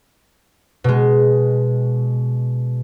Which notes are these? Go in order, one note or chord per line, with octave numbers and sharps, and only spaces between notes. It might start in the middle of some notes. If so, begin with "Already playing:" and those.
B2 G#3